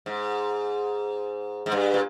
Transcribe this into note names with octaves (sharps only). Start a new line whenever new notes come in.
G#2
G#2
G2
A#2